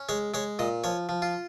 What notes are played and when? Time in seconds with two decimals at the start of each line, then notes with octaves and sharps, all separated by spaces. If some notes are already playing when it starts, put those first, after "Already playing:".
Already playing: C#4
0.09 G#3 C#5
0.34 G#3 C#5
0.59 A#2 D#5
0.84 F3 C#5
1.09 F3
1.22 F4